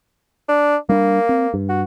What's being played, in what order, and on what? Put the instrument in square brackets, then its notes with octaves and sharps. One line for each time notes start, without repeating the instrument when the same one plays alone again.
[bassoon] D4
[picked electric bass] G3 D4 [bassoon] A#3
[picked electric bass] C4
G2
[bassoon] F#4